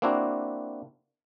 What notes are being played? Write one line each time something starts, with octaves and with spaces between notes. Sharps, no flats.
A#3 C4 D4 E4 F#4